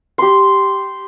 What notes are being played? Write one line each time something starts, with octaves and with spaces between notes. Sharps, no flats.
G4 C6